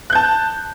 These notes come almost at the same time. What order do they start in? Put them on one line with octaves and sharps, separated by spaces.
F#6 G6 A5